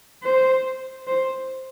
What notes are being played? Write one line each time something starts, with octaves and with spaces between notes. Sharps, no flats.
C5
C5